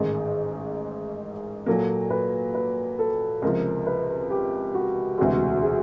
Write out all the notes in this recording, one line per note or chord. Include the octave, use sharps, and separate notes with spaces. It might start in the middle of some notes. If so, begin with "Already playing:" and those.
Already playing: A1 G#2 D#3 G#3 G#4
A#2 F#3 A#3 A4
B4
B4
A4
C#2 C3 F3 A#4
B4
G4
F#4
E1 D2 C3 E3 G#3 F#4
G#4